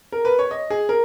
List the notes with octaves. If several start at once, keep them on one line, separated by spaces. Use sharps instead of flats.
A#4
B4
C#5
D#5
G#4
A#4